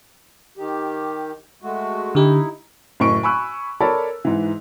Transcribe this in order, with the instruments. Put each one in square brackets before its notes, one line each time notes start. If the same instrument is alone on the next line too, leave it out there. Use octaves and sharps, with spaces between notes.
[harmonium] D#3 G4
G#3 A3 F#4
[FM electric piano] D3 G4 [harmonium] D#4 E4
[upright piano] F#1 A2 C#6 D7
G#5 B5 C#6 E6 F#6
A4 A#4 C#5 D5 A5 B5
G#2 E3